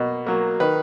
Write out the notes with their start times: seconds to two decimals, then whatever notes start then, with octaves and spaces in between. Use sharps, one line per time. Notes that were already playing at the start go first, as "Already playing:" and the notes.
Already playing: B2 F#3 A#3
0.26 F#3 A#3
0.60 D#3 B4